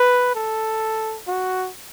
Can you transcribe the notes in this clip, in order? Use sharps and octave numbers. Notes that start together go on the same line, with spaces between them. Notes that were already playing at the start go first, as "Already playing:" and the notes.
Already playing: B4
A4
F#4